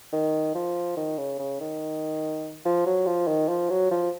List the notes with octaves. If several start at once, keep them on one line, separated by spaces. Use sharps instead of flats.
D#3
F3
D#3
C#3
C#3
D#3
F3
F#3
F3
D#3
F3
F#3
F3